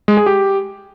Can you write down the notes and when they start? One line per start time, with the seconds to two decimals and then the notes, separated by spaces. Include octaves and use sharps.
0.08 G#3
0.17 G#4
0.26 G4